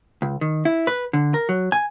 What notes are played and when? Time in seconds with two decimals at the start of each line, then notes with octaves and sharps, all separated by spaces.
0.22 C#2
0.41 D#3
0.65 E4
0.87 B4
1.13 D3
1.34 A#4
1.49 F#3
1.72 G#5